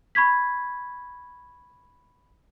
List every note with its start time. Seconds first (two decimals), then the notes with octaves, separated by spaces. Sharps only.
0.15 B5 C#6 G#6 B6